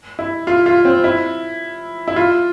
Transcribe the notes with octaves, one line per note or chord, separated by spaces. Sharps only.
E4
F4
F4
C4
E4
E4
F4